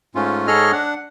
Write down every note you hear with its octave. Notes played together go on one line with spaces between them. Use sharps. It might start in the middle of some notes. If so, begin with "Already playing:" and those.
G#2 A3 C#4 F4
G#2 G#4 A4 C#5 D#5 F6
D4 F#5